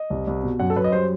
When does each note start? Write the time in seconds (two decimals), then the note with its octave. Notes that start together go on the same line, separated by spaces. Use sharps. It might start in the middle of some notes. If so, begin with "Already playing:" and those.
Already playing: D#5
0.10 C2
0.27 C2
0.43 B2
0.60 F#2 F#5
0.70 A4
0.76 F#2 B4
0.84 D#5
0.92 G3 C5